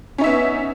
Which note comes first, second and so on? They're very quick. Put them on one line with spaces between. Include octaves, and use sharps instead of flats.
C#4 D#4 E5 B3